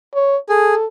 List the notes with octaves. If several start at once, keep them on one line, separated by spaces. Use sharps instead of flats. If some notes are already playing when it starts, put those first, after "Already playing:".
C#5
G#4 A4